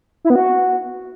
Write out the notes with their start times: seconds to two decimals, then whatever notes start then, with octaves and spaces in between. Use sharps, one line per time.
0.25 E4
0.30 B3
0.36 F#4